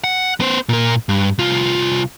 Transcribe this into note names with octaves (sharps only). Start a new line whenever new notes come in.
F#5
B3 C5
A#2 A#4
G2
C2 F4